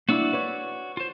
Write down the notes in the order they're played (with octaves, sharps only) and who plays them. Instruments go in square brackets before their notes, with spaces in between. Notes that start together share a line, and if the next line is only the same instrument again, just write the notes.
[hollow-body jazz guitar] A#3 D4 E4 [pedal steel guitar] F#4 D5 E6
[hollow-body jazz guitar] B4 C#5
[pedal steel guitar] F4 C5